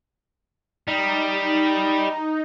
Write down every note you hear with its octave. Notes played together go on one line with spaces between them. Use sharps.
G3 D#4